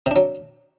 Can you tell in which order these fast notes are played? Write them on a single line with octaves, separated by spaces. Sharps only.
C3 D4 F#3